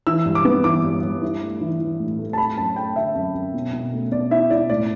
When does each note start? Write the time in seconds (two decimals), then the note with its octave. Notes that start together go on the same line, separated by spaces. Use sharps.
0.07 E3 E6
0.26 G2
0.35 D6
0.45 B3
0.64 E3 D6
0.84 G2
1.02 G2
1.22 E4
1.42 A3
1.61 E3
1.80 E3
2.00 A2
2.19 A3
2.33 A5
2.38 A3 B5
2.58 F#2 A5
2.76 A3 G5
2.96 D3 E5
3.15 F#2
3.34 F#2
3.54 B2
3.73 B2
3.93 A3
4.12 B2 D5
4.31 E4 E5
4.50 E4 D5
4.70 A2 D5